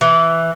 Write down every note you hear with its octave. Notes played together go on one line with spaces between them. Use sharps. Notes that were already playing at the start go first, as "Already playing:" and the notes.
E3